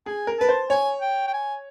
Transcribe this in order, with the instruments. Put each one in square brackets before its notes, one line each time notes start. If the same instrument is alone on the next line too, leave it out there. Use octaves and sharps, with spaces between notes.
[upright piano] G#4 [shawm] G#5
[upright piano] A#4
[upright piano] B4 [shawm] A5
[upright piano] C5
[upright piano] C#5 [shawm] G#5
[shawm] G5
G5
G#5